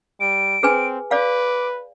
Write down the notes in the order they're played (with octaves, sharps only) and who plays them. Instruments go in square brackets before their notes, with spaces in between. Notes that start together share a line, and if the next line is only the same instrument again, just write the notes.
[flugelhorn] G3 [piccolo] D7
[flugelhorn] C4 [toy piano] G#4 B4 G#5
[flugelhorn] B4 [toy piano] D5 F5 [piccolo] D6